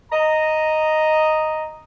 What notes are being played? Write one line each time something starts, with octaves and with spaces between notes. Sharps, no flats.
D#5 A#5